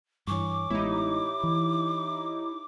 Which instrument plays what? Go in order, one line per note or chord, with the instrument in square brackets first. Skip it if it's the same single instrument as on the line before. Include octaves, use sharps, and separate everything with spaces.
[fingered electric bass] G2 E3 [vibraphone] C#5 G#5 C#6 [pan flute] D6
[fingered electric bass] A1 G#3 B3 [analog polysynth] D#4 E4 [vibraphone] G4 C#5
[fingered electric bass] E3